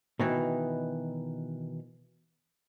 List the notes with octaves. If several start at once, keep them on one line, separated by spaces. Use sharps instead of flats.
B2 D#3 E3